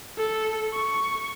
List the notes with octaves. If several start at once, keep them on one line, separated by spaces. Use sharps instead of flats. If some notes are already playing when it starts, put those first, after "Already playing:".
A4
C#6